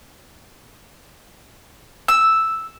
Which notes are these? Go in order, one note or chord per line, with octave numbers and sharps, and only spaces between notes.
E6